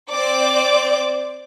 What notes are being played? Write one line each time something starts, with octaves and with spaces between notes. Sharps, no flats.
C4 C5 D5 D6